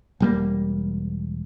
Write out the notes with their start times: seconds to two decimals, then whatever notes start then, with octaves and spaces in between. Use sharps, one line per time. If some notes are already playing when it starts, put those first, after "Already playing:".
0.20 E1 G3 A#3